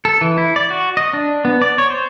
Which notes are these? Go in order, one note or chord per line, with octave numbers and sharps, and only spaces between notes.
A4
E3
E4
D5
F#4
D#5
D4
B3
D5
C#5
C5